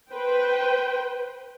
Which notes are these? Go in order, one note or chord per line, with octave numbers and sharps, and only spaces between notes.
B4 C5 G5